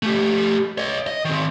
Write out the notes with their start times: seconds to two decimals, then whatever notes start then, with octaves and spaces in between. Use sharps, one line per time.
0.03 A3 G4
0.78 C#5 D#5
1.07 D#5
1.25 D#3 C4